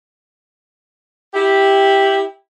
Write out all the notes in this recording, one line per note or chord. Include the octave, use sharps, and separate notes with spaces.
E4 G4